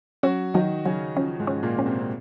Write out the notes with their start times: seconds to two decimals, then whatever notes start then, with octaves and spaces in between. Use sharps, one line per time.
0.23 F#3 C#4 F#4
0.54 D#3 F#3 D#4
0.85 C#3 F#3 C#4
1.17 F3 C#4
1.39 G#2 G#3
1.47 C#4
1.63 A#2 A#3
1.79 C#4
1.86 C3 C4
1.98 C4